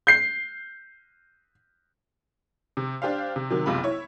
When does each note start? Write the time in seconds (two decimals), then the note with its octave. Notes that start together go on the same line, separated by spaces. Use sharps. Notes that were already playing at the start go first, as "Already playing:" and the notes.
0.07 G6 C7
2.77 C3
3.02 D4 G4 C5 F5
3.36 C3
3.50 C3 D#3 F#3
3.66 F#1 B1 C3 F4 B5
3.83 E4 C#5